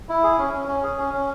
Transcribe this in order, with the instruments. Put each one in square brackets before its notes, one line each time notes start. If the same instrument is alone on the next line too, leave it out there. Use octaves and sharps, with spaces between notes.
[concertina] E4
G#4
C#4
C#4
C#4
G#4
C#4
C#4